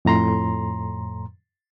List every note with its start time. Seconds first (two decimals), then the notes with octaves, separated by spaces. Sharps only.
0.05 F2 A2 A#5 C6